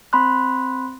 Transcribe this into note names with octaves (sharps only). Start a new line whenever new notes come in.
C4 B5 C6 F#6